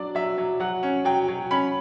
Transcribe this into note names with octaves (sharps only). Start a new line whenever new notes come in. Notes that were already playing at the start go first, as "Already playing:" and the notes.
Already playing: F#3 D4 D5
F#3 E5
F#3
F#3 F#5
C#4
F#3 G5
F#3
C#4 B5